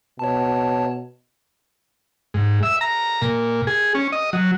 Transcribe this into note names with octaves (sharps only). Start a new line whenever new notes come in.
B2 C#5 A5
G#2
E5
A#5
A#2
G#4
C#4
D#5
F#3